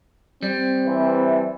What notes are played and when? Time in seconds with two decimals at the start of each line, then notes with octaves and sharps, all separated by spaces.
0.43 G3 C4
0.86 C3 E3